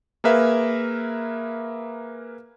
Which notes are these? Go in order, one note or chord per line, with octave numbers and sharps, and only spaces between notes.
A#3 G#4 A#4 B4 E5 F5